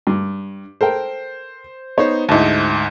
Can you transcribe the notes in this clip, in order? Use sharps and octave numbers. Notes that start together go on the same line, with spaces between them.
G2
A4 A#4 C5 G5
B3 D#4 C5 C#5
D2 G#2 E4 D#5 A5